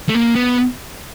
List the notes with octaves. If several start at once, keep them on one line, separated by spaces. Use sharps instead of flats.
A3
A#3
B3